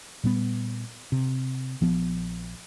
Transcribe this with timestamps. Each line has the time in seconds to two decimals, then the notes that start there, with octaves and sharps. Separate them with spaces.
0.24 A#2 G3 B3
1.12 C3
1.81 A#1 F3 B3